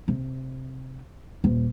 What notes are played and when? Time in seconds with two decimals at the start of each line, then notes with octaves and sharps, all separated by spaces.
0.08 C3
1.44 D#1